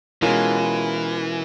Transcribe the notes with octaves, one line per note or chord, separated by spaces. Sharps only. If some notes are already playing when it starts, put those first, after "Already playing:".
B2 E3 G#3 C#4 F4 A#4